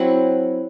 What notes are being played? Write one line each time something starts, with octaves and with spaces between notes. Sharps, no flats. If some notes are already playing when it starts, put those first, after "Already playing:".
Already playing: F#3 C4 E4 F#5